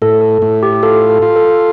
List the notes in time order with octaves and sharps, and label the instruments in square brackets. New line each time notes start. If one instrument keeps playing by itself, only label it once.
[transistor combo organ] A2 [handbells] A4
[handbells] A4
[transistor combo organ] A2
[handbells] G4
[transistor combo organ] F4 [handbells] A4
[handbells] A4
[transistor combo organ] F4
[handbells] A4